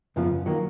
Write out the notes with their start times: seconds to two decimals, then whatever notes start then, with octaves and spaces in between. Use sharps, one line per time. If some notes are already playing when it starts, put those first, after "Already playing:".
0.16 F#2 C#3 F3 B3 F4
0.46 D#3 F#3 A#3